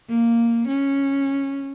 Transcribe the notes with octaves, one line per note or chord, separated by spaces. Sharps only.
A#3
C#4